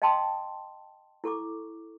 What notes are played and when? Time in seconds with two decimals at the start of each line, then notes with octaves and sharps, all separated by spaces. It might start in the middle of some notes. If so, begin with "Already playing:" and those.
0.02 D#5 F5 G5 A5 C6 D#6
1.24 E4 A4 C#6 D6